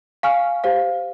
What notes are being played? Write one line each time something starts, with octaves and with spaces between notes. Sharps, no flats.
F5 G#5 C#6 F6
G4 C5 F5